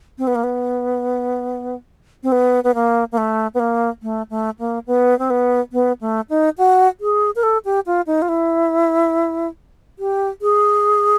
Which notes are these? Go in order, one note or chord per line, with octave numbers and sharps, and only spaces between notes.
C4
B3
A#3
B3
C4
B3
B3
A#3
A#3
A3
B3
A#3
A3
A3
A#3
B3
C4
B3
B3
A3
D#4
F#4
G#4
A#4
A4
G4
F4
D#4
F4
E4
G4
G#4